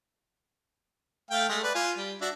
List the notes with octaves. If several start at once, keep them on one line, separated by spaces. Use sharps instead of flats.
A3 F5 G5
G#3 A3
B4 D5
F4 G#5
G3
D4 F#4 E5